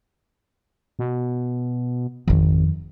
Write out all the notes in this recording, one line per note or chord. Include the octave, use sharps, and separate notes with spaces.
B2
G#1 F2 D#3